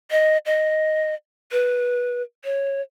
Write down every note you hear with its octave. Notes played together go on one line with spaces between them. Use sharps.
D#5
D#5
B4
C#5